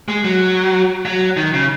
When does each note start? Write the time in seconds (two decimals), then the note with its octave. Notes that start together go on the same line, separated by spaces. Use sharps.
0.08 G#3
0.24 F#3
1.05 F#3
1.37 D#3
1.54 C#3